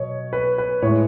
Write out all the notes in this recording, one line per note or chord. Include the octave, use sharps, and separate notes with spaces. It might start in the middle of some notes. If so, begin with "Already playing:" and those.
Already playing: B2 F#3 C#5 D#5
B4
B4
A2 G#3 C#5